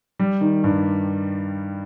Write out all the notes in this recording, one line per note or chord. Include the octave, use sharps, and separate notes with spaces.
G3
D#3
G2